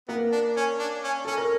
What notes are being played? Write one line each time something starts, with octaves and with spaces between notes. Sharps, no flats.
A#3 B3 A#4
D4
C#4
D4
C#4
C#4 A4
A#4